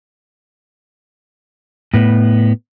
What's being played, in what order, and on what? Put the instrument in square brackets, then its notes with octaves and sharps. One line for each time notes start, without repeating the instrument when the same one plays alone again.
[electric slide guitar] A2 B3